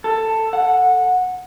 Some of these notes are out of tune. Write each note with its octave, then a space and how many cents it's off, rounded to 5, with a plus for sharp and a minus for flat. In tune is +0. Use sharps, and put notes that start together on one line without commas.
A4 +10
F#5 -15